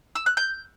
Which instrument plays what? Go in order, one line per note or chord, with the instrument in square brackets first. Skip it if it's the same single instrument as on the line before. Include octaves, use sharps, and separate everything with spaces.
[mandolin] E6
F#6
G6